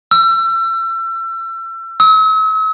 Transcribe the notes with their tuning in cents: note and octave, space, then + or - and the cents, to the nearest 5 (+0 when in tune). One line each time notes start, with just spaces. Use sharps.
E6 +35
E6 -45